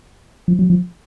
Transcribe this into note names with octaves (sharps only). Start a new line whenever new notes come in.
F3
F#3
F3